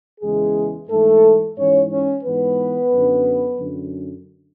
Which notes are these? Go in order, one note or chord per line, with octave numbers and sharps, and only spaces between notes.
E2 C#3 E3 G#3 G#4
G#2 E3 A3 A4
G#2 E3 C#4 C#5
C#4 C#5
G#2 E3 B3 B4
F#2 D3
F#2 D3